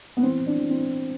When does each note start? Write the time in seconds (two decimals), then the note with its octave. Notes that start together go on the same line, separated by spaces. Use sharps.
0.17 B3
0.23 E3 C4
0.40 E3
0.46 D4
0.58 E3
0.70 C4